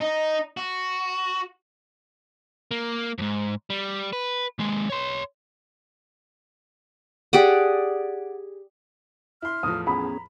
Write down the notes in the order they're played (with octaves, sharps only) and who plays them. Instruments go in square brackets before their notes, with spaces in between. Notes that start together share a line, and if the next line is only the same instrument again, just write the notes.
[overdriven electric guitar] D#4
F#4
A#3
F2 G#2
G3
B4
D#2 G#3
C#5 C6
[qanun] G4 G#4 D5 F#5
[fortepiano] E4 C6 [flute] F6
[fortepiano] E2 A2 F3 [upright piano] D#6
[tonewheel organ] B3 C#4 G#4 [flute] A#5 [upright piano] B5